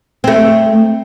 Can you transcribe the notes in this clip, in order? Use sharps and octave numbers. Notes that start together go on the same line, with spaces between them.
A3 C4